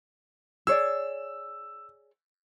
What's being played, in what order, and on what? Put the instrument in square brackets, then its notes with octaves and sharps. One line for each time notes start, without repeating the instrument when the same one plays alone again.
[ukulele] G#4 C#5 D5 [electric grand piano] E6